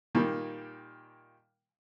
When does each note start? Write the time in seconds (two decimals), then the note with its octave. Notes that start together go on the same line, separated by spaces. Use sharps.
0.15 A#2 D#3 G3 A#3